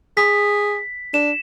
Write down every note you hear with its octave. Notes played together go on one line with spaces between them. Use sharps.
G#4 B6
D4 E7